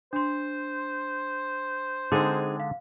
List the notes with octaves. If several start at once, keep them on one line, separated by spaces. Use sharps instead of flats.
D4 C5 C6
D3 G#3 C4 D#4 G#4 A4
F5